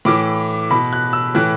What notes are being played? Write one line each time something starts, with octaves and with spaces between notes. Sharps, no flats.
A2 E3 D6
B2 B5
F#6
E6
A2 E3 F#6